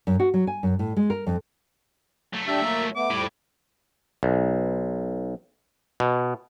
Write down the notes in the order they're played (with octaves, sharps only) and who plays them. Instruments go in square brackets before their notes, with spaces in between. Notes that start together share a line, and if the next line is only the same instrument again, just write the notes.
[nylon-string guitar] F#2
F#4
F#3
G#5
F#2
A2
G#3
A#4
F2
[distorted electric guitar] F#3 A3
[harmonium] D4 G4 [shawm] E5
[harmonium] A#3
[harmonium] A3 B3 [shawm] D6
[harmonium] F2 G3 [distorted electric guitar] A2
[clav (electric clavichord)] B1
B2